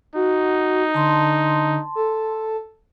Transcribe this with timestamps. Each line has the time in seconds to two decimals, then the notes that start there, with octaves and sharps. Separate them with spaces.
0.15 D#4 F#4
0.94 D3 A5 C6
1.95 A4